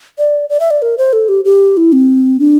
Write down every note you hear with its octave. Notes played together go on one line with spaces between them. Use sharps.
D5
D5
E5
D5
A#4
C5
A4
G4
G4
E4
C4
D4